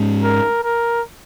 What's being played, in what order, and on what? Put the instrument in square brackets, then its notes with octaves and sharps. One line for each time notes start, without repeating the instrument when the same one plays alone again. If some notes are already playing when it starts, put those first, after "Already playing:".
Already playing: [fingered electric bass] G#2 G#3 C#4
[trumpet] A#4
A#4